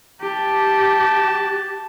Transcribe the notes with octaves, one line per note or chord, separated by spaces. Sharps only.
G4 A5